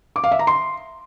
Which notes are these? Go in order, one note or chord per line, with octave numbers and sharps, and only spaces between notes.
D6
F5
E5
A#5
C6